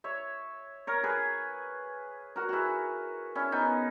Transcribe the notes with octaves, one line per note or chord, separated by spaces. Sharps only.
C#5 E5
A#4 C#5
G#4 B4
F#4 A#4
E4 F#4 G#4
C#4 E4
B3 D#4